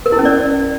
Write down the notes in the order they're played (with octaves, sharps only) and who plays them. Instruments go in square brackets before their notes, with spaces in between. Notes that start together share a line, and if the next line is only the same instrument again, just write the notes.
[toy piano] A#4
E4
C#4
D5